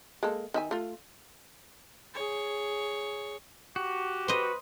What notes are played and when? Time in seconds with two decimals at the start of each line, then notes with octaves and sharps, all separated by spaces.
0.23 G#3 A#3 A4
0.54 D#3 E5 G#5
0.71 A3 F4
2.14 G#4 C#5
3.76 F#4 G4
4.28 B4 C5 D#5